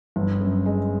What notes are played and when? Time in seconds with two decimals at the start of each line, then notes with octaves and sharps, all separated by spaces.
0.16 G1
0.41 F#2
0.66 G#3